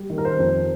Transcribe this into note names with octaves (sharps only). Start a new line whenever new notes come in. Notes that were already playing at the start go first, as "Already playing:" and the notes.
Already playing: G3
D#3
A#4
C5
F2